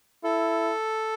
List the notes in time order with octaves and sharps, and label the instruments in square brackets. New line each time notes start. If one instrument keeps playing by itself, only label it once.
[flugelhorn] E4 [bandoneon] A4